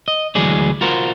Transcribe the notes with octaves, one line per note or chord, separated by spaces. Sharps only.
D#5
D2 E3 F#3 G#3 G#4 D5
F4 F#4 A#4 C5